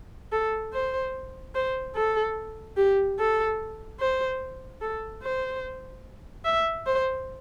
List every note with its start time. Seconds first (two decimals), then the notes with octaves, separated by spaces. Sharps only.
0.32 A4
0.74 C5
1.55 C5
1.96 A4
2.77 G4
3.19 A4
4.00 C5
4.81 A4
5.23 C5
6.45 E5
6.86 C5